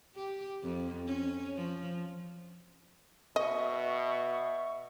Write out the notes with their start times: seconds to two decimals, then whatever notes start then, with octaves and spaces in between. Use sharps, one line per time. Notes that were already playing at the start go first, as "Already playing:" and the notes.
0.15 G4
0.63 F2
1.07 C#4
1.56 F3
3.36 B2 D#5 E5 C#6